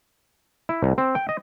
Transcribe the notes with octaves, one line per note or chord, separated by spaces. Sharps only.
E4
C2
C4
G5
D#5